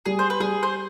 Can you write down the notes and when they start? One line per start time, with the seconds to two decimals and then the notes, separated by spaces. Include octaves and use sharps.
0.06 G3 G#4
0.19 C5
0.30 B4
0.40 G3 G#4
0.63 C5